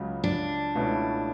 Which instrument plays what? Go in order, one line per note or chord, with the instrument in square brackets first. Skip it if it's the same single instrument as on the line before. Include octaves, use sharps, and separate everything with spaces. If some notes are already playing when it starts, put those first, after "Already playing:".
Already playing: [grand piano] C#2 C#3 F#3
[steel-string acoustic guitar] D4
[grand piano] C#2 B2 A3 C#4 E4